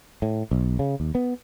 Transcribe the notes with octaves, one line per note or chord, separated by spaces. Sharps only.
A2
B1
C#3
D#2
B3